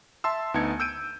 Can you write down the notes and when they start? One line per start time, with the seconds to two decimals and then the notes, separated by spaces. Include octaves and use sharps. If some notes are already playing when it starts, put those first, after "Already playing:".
0.24 E5 A5 C6 E6
0.54 D2 B3 D#4 A5 G#6 C#7
0.80 E6 G6 D7 D#7